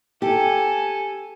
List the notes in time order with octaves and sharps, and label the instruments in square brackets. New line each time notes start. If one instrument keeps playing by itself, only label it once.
[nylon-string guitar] G4 [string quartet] A4 G#5